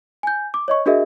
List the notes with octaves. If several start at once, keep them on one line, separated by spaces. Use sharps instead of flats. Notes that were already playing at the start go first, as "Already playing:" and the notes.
G#5 G6
D6
C#5 D#5 C#6
D4 F#4 G#4 A#4 D#5 E5